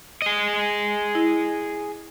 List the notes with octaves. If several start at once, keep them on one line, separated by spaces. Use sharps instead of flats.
G#4 D#5
E4